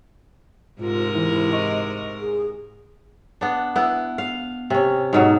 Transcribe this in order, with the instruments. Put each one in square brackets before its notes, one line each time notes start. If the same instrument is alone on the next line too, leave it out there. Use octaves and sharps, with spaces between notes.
[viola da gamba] G#2 C3 A#4 [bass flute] F4
[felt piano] E3 [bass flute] E4
[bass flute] D#5 [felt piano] C#6
[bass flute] G#4
[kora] B3 D4
B3 E4
F5
C3 C#4
G#2 B2 F#3